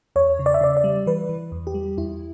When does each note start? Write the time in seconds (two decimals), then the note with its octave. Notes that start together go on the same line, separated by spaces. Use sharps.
0.16 E2 C#5
0.39 C#3
0.46 D5
0.54 E5
0.61 C#3 D5
0.77 D5
0.84 G3
1.07 E3 B4
1.29 E3
1.52 E2
1.67 G4
1.74 G3
1.97 E2 E4